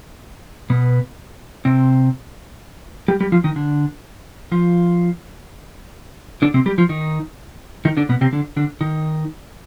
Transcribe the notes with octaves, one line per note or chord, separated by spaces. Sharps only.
B2 B3
C3 C4
G3 G4
G3 G4
F3 F4
D#3 D#4
D3 D4
F3 F4
D3 D4
C3 C4
G3 G4
F3 F4
D#3 D#4
D#3 D#4
D3 D4
B2 B3
C3 C4
D3 D4
D3 D4
D#3 D#4